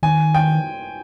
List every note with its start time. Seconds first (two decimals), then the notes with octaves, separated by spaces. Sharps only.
0.03 D#3 G#5
0.35 G5